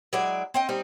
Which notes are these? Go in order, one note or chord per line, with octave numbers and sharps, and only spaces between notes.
F#3 G#3 E4 D5
C4 D#5 G5
G3 C4 D#4